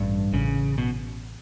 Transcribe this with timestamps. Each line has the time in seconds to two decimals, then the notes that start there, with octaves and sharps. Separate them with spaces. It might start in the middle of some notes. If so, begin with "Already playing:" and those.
Already playing: A1 G2
0.32 A1 C#3
0.78 B2